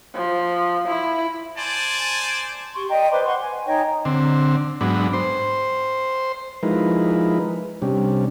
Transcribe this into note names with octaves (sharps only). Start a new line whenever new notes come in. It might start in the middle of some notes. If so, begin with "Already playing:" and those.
F3
E4
C5 D5 G#5 A5
G4 C6 C#6
D5 D#5 G5 A#5
B4 C5 C6 D6
F#5 C6 C#6
G#5
D#4 C#5 D#5 G5
D3 C4
G#2 F#3 B3 D4
C5
F3 G#3 D#4 E4 A#4 B4
C3 G3 C#4 D4